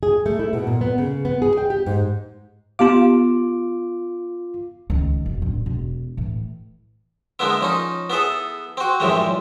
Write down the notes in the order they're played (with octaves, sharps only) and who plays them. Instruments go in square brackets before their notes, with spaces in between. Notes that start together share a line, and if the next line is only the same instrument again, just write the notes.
[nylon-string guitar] G#4
A3
E4
B2
A#2
B3
C#3
B3
G#4
G5
G4
G#2
[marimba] B3 G4 F5 [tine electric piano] F4 D6
[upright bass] C#2 D#3
E1
D1
E1
A2 E3
[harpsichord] D3 G#3 A#3 B3 E4
F3 C#4 D#4
B3 E4 G#4 A4
C4 F#4
F#2 A2 E3 F3 G3 G#3